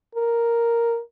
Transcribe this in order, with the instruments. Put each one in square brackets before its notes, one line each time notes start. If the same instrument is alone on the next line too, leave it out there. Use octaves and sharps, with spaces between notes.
[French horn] A#4